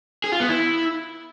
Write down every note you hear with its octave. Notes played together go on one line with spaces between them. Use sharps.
G#4
F4
B3
E4